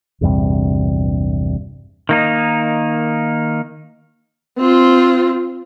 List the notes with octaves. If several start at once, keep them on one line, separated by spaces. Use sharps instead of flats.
A#1 E2 G2 C3
D#3 A#3 D#4
C4 F4